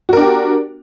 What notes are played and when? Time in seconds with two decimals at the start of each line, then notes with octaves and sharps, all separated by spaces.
0.09 F#4
0.13 A#4
0.17 D4
0.21 G4